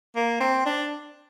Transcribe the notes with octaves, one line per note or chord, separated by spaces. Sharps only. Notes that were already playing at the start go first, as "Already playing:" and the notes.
A#3
C4
D4